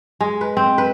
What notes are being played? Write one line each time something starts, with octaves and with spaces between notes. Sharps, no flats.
G#3
B4
C4
B4